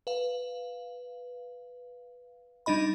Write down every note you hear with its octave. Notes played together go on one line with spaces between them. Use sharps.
B4 F5
G3 D4 D#4 D#5 B5